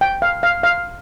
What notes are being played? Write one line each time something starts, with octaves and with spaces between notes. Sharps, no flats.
G5
F5
F5
F5